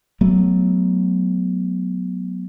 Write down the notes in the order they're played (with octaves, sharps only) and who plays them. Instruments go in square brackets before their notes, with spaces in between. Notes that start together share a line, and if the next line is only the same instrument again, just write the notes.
[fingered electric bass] F#3 A3 B3